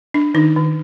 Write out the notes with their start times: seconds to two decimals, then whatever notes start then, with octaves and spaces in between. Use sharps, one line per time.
0.14 D4
0.34 D#3 D#4
0.56 D#3